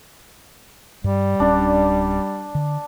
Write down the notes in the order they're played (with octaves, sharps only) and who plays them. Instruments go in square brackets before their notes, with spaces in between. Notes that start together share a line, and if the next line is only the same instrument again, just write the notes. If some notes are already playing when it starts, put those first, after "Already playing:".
[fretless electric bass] G2 [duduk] G3
[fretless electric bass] D1 C#4 [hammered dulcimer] D4
[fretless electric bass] D3